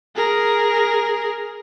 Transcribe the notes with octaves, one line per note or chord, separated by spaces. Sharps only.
G#4 A#4